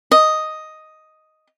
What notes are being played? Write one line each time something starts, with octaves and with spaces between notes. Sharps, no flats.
D#5